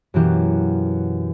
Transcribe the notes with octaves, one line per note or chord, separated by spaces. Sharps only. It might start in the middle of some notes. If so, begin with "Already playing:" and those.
F#2 B2 E3 A#3 G4 F#6